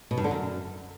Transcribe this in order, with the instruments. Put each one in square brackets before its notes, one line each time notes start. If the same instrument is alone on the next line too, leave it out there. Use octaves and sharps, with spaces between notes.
[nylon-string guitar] B2
G2
D3
F#2